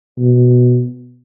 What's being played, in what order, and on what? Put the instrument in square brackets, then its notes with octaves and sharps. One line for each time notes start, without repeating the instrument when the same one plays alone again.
[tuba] B2